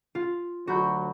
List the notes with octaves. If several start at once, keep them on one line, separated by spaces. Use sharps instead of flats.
F4
D2 D3 F#3 F#4 B5 G6